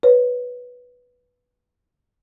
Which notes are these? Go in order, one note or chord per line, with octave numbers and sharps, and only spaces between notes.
B4 C#5